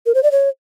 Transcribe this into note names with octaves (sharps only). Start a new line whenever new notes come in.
A#4
C5
D5
C#5